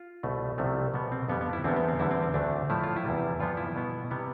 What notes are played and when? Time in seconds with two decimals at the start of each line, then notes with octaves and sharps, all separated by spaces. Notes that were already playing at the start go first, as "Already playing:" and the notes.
Already playing: F4
0.23 C2 B2 A3
0.58 C2 C3 F3 A3
0.94 B2 G3 B3
1.12 C4
1.28 F2 D3 G3 B3
1.41 B3
1.53 E4
1.64 E2 D3 G3 B3 C4
1.76 B3
1.88 C4
1.99 E2 D3 G3 E4
2.11 C4
2.23 C4
2.34 D2 D3 A3 D4
2.70 A2 F3 A3 E4
2.84 F4
2.96 E4
3.05 E2 C3 G3
3.40 G2 D3 F3 B3 F4
3.57 E4
3.76 B2 B3
4.11 C3 G3 B3